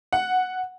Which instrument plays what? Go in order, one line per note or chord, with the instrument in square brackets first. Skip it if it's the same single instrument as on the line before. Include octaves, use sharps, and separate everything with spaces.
[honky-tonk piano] F#5